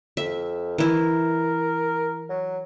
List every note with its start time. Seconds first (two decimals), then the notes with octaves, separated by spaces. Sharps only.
0.17 F2 E5
0.78 E3 E4 A#4
2.29 F#3